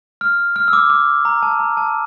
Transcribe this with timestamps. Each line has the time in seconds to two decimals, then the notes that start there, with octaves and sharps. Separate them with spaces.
0.21 F6
0.56 F6
0.68 E6
0.73 D6
0.90 D6
1.25 A#5
1.43 A5
1.60 A#5
1.77 A5